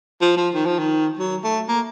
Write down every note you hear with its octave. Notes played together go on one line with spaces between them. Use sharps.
F3
F3
D#3
F3
D#3
F#3
A3
A#3